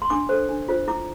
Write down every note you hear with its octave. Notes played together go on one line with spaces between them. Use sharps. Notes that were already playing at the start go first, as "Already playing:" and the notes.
C6
D4 D6
A4 C5
D4
F4 C5
E4 D6